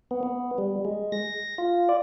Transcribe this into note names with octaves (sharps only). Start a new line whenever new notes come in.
B3
B3
G3
G#3
A#6
F4
D5